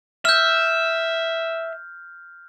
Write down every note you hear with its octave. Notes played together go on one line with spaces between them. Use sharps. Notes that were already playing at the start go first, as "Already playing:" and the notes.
E5 F6 G6